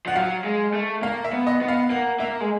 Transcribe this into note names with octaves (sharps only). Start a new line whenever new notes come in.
F3 F#5
F#3 F5
G#3
A3
A#3 F5
E5
B3
D#5
B3
F5
A#3 F#5
A#3 E5
G#3